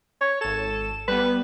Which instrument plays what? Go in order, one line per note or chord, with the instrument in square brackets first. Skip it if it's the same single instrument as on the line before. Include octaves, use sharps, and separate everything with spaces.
[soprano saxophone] C#5
[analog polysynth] G#1 E7 [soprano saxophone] A4
[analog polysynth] G3 B3 [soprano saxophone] B4